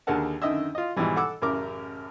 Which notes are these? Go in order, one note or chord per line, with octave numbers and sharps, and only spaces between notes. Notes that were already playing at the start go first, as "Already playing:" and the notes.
D#2 D3 G#4 A#4 F#5 A5
F#2 D3 D#3 D#5 E5 E6
F4 D#5
G#2 B2 D#3 E3 G3
A4 F#5 D6 E6
A1 F#2 C#3 A#4 D6